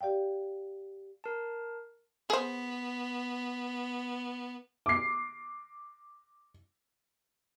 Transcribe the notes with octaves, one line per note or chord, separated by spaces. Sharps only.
G4 D5 F5 G5
A#4 A5
B3 G#4 C5
D6 C7